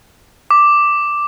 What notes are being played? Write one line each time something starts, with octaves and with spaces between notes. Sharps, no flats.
D6